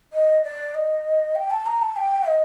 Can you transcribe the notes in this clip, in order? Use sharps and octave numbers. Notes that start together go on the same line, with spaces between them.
D#5
D5
D#5
G5
A5
A#5
A5
G5
D#5